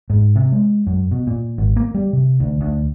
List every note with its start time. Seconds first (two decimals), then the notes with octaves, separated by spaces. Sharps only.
0.10 G#2
0.36 C3
0.52 G#3
0.87 F#2
1.11 B2
1.27 A#2
1.58 G#1
1.76 A#3
1.94 G3
2.13 C3
2.40 D2
2.61 D2